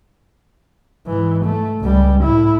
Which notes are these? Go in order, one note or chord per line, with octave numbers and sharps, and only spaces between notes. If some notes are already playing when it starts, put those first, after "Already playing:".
G#2 E3
A3
C#2 G3
A2 E4